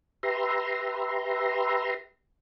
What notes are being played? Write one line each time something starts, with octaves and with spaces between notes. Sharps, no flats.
G4 B4 E5 A#5 C6